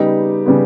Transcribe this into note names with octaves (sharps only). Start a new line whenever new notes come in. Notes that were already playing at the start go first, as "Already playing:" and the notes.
Already playing: C#3 G3 B3 D#4 G4
C#3 G3 B3